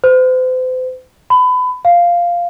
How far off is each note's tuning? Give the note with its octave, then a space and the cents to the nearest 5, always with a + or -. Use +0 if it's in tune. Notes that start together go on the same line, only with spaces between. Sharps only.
C5 -40
B5 +25
F5 -5